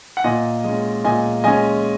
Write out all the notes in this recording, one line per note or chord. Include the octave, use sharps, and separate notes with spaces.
F#5
A#2 D#5 G#5
G#3 C#4
A#2 D#5 G#5
G#3 C#4 D#5 G#5